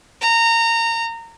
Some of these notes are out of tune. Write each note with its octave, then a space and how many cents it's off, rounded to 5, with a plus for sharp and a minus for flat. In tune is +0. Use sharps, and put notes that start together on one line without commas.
A#5 -25